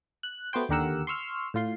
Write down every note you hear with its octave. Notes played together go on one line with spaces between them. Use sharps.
F#6
A3 B3 F#4 C5 G5
D#2 D3 G4 A#4 F#5 E6
C6 C#6 E6 F6
A2 F4 C6